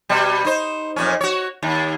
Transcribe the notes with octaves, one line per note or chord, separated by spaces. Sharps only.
B2 G3
D#4 C5
F2 A#2 C#4
F#4 C#5
D#2